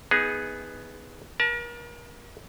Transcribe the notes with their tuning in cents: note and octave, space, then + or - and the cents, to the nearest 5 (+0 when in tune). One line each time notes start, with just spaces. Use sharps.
B3 +0 D#4 +25 G#4 +0
A#4 +40 A5 +0